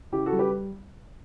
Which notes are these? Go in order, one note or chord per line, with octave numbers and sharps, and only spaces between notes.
C#3 E4 G4
F#4 A4
G3
G4 B4